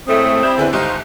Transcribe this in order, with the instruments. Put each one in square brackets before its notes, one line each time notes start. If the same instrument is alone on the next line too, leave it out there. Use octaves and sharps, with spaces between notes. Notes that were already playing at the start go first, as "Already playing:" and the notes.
[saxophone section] A2 G#3 A3 [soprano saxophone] C4 [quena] D#6
[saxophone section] G3 E4 [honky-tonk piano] G6
[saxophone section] E2 [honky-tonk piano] D3 E4 B4 [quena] G#5
[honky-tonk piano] G1 C#2 G4 [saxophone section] D#4 F4 [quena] C5